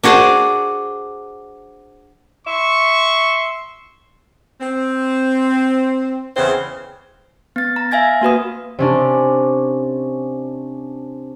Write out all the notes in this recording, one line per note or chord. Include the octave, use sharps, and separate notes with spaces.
D4 F#4 G#4 C5 D5
E5 C6 C#6
C4
E2 C#3 C4 E4 C5
B3 A6
A#5
E5 F5 G#5 G#6 A#6
A#3 F#4 B4 D#6
C3 C#4 D4